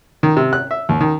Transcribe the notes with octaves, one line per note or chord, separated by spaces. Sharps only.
D#3
C3
F#6
E5
D#2
D#3